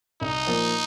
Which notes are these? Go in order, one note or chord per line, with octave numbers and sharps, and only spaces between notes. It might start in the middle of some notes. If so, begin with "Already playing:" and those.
C2 D#4
A#2 F3 A#3